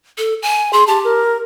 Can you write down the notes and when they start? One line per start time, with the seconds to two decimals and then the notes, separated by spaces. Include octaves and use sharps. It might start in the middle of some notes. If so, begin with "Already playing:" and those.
0.18 A4
0.42 G#5
0.73 G#4 C6
0.87 G4 A5
1.05 A#4